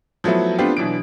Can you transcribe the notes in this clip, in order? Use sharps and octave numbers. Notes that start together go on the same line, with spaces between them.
F3 F#3 A3 B3 E4
A3 B3 C4 D4 F4 G4
B2 E3 F#3 D4 D7